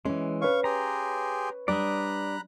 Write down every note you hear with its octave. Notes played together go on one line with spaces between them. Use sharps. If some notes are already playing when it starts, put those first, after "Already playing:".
E3 G#3 C#4
B4 C#5 F5 C#6
G4 G#4 A#5 C6
G3 D4 D5 A#5 B5 D#6 F#6